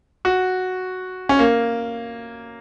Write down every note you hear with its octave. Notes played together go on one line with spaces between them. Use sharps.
F#4
C#4
A#3